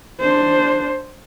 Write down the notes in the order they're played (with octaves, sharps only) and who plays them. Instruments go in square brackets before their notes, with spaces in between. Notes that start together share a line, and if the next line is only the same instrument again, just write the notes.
[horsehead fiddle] D4 C5